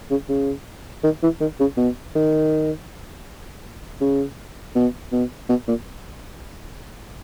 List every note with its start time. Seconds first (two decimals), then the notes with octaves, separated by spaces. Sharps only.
0.10 C#3
0.29 C#3
1.03 D#3
1.23 E3
1.40 D#3
1.60 C#3
1.77 B2
2.15 D#3
4.01 C#3
4.75 B2
5.12 B2
5.49 B2
5.68 A#2